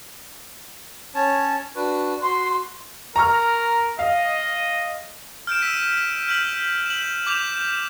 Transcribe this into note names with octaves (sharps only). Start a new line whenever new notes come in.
C#4 C#5 A5
D4 F#4 B4
F#4 C6
A#4 A#5 C#6 F6
D#5 F5
F6 G6 D7 E7
E6 B6 D#7
F6 G6 B6 F#7
E7 F#7
D6 G6 E7 F7